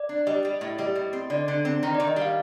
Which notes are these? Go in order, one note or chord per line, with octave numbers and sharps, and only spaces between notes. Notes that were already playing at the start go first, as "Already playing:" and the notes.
Already playing: D5
D4
G3 D#5
G3
A2
G3 D#5
A2
C4
D3 D5
D3
C4
D#3
D#3 D5
D#5
G3
F5